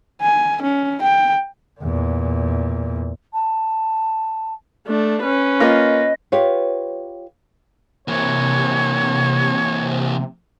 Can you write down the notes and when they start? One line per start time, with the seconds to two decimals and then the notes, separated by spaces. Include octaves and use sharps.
0.22 G#5
0.62 C#4
1.02 G5
1.80 E2 A#2
3.33 A5
4.87 A3 D4
5.23 C#4 B4
5.60 A#3 F4 D#5
6.32 F4 G4 B4 C#5
8.08 C3 E3 A#3 C#5